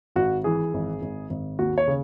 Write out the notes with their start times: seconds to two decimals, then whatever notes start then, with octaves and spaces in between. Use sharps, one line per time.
0.16 G#1 F#4
0.44 E3 G#4
0.74 G#1
1.02 G#1
1.30 G#1
1.59 D#2 F#4
1.78 C#5
1.87 C#3